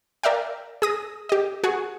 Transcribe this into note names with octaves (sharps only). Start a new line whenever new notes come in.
A#4 D5 E5 F5 G5
G#4 D#6 A#6
G4 D#5
F#4 G#4